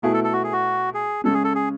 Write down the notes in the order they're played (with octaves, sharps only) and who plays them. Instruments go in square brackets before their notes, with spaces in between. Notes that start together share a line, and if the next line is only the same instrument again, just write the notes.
[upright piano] B2 A3 E4 [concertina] G#4
[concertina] A4
A4
F#4
G#4
F#4
G#4
[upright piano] C#3 G#3 C#4 [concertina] A4
[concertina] G#4
A4
G#4